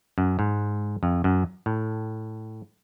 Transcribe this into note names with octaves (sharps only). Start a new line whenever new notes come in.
F#2
G#2
F2
F#2
A2